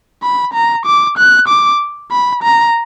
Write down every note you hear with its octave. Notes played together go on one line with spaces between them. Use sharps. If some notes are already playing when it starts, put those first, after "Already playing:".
B5
A#5
D6
F#6
D6
B5
A#5